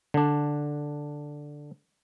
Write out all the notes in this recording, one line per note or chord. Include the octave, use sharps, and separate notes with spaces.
D3 D4